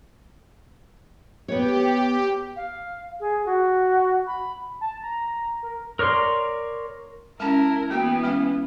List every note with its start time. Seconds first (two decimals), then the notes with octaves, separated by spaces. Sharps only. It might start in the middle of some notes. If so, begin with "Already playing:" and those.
1.48 B3 G4 B4 C#5
2.56 F5
3.20 G#4
3.46 F#4
4.27 B5
4.81 A5
5.03 A#5
5.63 A#4
5.99 A#4 C#5 D5 C6
7.40 G#3 C#4 E4 A#4 A5
7.90 E3 A#3 B3 F#4 G5
8.23 G#3 C#4